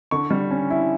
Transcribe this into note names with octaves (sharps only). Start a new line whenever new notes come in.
D3 C#6
G3
C#4
E4